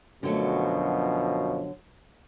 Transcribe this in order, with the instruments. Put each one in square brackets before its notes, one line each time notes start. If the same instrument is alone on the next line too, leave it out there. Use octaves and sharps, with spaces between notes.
[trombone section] F#2 B2 F3 [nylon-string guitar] D3 F#3 A3